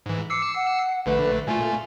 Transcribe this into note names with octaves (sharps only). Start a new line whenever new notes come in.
G#2 E3
D6 E6 C7 C#7
F#5
A#1 D3 A3 B4
A#2 A3 F4 G#5